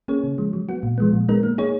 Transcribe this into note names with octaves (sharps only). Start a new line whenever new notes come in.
A#3 C#4 G#4 C#5
C#3
F3 G#3
F#3
B3 F#4
A#2
F3 G#3 B3
A#2
G#3 B3 D#4 A#4
A#3
D#4 G#4 C#5